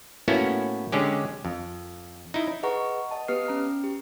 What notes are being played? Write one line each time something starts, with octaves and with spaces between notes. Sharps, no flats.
A2 A#3 B3 C#4 E4 F#4
D3 G#3 C#4 G4
F2
D#4 E4
G#4 B4 D#5 F#5 A#5 C#6
D#5 A5
B3 G4 B4 D#6 F6 C7
C#4 A#5 F6 C7
G4